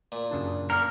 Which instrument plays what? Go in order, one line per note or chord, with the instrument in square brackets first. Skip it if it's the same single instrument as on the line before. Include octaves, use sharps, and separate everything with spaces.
[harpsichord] A#2
[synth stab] F#2 C#3 D4
[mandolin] A#3 C#6 F6 [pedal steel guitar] A#4